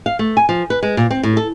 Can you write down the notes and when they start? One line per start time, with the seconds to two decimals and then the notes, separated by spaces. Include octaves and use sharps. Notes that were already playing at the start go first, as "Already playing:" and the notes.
0.06 F5
0.19 A3
0.37 G#5
0.49 F3
0.70 B4
0.83 G#3
0.97 A#2
1.11 C4
1.23 A2
1.37 A4